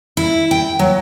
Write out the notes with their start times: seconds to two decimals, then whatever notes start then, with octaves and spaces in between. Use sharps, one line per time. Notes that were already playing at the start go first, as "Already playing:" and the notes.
0.17 E4
0.51 G5
0.79 F#3